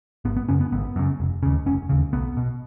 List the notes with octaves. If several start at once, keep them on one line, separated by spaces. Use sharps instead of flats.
G#1 B3
B3
F#2 C#3 C#4
B3
G#1 B3
F#2 C#3
F1
D#2 C#3
F1 C#4
D#2 C#3
B1 B3
B2